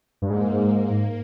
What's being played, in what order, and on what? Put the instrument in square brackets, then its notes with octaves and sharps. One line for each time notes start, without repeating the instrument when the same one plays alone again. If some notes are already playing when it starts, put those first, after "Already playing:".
[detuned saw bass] G2
[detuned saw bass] G#2 [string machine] A#3